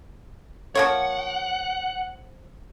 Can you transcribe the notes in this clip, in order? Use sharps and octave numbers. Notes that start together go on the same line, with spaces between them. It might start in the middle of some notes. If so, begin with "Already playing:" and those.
F3 A#3 C#5 F#5